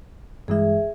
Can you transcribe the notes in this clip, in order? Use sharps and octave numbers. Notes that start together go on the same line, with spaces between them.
G2 E3 G#3 G#4 E5